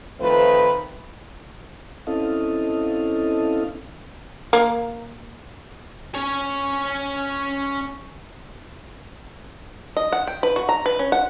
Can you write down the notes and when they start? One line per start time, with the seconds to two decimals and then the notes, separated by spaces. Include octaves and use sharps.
0.20 D#3 F3 A3 C4 F4 B4
2.07 C4 C#4 E4 A4 D#5 F5
4.53 A#3
6.15 C#4 C#5
9.97 D#5
10.13 F#5
10.27 G5
10.43 B4
10.56 F#4
10.69 A#5
10.86 B4
10.99 C#4
11.12 F#5